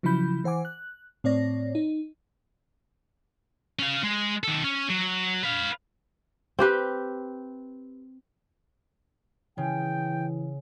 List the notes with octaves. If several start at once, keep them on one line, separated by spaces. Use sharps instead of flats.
C#3 F3 F#3 E4 B5 G6
E3 C5 F#5 G#5 D6
F#6
A2 C4 C#5 D5 A#6
D#4
C#4 F5
G#3
D#3 A4
C#4
F#3
B4 F5
C4 G4 B4
C#3 E3 G5